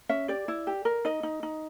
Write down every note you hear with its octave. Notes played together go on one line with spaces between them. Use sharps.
C#4 E5
G4 D5
E4
G4
A#4
D#4 D#5
D#4
D#4